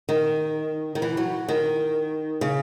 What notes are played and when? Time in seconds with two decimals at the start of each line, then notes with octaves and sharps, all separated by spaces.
0.09 D#3
0.95 D#3
1.02 E3
1.17 F#3
1.48 D#3
2.41 C#3